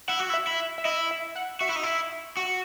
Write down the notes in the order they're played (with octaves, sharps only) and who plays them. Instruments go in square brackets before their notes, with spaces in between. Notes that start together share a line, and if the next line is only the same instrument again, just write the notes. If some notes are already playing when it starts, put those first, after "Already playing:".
[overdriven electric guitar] E4 [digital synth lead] F#5
[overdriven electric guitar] F#4
E4
[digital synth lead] E5
[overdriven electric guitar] E4
[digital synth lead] E5
E5
[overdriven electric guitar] E4 [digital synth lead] D#5
[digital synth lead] E5
F#5
[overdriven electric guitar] F#4 [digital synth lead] E5
[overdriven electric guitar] E4
D#4
E4
F#4